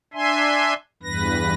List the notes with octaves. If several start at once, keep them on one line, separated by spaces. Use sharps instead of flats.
D4 E5 G#5 C6
E2 G2 B4 A#6